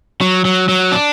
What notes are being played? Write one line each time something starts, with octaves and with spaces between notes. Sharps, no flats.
F#3
F#3
F#3
D4